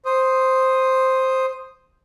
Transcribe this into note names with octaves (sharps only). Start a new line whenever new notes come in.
C5 D#6